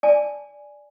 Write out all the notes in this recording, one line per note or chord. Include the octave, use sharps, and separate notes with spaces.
D5 G#5 A5